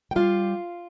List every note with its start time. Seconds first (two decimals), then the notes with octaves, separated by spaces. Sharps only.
0.11 G5
0.16 G3 F4 F5